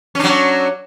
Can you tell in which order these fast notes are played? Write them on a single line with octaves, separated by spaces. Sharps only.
C#4 D4 F#3